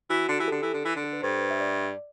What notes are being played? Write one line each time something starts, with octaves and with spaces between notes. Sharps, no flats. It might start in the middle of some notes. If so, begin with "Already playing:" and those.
E3 F#4
D3
E3 G4
D3 A4
E3
D3
E3
D3
A4
B4
G2 C5
E5
D5